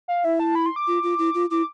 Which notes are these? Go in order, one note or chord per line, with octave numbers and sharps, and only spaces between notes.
F5
E4 E5
A5
B5
C6
D6
F4
F4
E4
F4
E4 D6